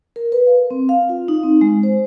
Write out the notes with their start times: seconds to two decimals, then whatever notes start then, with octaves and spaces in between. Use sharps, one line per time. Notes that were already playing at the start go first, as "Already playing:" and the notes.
0.16 A#4
0.32 B4
0.47 F5
0.71 C4
0.89 F5
1.09 F4
1.28 D#4
1.43 C4
1.61 G#3
1.83 C5